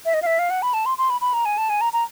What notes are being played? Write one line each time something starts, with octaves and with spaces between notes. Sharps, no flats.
E5
D#5
F5
E5
F5
F#5
B5
A5
C6
C6
B5
B5
A#5
G#5
A5
G#5
A#5
A#5